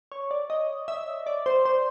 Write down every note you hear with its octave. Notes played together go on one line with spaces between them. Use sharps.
C#5
D5
D#5
E5
D5
C5
C5